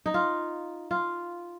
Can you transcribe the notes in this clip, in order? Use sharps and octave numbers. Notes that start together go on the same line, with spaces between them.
D#4
F4
F4